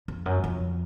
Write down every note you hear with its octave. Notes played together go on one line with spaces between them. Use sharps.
F2
F#2
F2